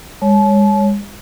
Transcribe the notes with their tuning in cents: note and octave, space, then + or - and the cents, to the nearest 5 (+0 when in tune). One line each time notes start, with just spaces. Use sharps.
G#3 -35 C#5 +0 A5 -35